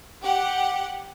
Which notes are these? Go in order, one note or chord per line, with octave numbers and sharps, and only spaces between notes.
G4 F#5